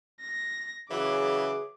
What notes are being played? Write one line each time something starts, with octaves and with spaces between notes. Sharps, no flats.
A#6
C#3 E3 F#3 G#4 D6